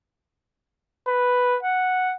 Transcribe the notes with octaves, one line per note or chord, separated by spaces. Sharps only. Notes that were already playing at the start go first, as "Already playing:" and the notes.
B4
F#5